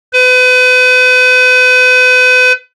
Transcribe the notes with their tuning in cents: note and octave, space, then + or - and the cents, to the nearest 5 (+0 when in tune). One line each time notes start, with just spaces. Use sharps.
B4 +35